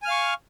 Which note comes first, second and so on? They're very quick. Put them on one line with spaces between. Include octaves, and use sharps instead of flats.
G#5 F6 F5 C#6